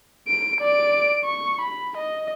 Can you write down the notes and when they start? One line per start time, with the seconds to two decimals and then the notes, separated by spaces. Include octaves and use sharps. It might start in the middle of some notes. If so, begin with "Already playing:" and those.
0.28 D7
0.61 D5 D7
1.25 C#6
1.61 B5
1.97 D#5